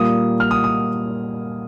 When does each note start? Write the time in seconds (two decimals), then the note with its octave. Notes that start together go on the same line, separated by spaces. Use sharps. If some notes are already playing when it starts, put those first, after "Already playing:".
Already playing: A#2 G3 A#3 D#6
0.40 F6
0.51 D#6
0.64 D#6